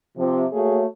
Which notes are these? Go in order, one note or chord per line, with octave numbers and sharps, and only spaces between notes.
C3 F3
A3 A#3 F#4 G#4 C#5